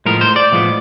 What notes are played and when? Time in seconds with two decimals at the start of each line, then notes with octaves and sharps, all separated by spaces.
0.06 A2 F3 G#3 B3 A#4
0.21 C5
0.36 D5
0.52 A2 F3 G#3 B3